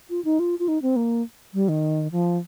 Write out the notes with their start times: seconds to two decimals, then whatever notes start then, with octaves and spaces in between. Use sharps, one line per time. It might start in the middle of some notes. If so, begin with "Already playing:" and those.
0.10 F4
0.25 D#4
0.39 F4
0.59 F4
0.68 D#4
0.82 C4
0.96 A#3
1.54 G3
1.69 D#3
2.12 F3